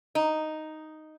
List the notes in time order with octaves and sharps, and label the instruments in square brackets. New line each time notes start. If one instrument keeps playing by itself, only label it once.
[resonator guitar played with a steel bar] D#4